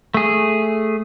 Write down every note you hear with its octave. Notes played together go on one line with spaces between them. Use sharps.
A3 G#4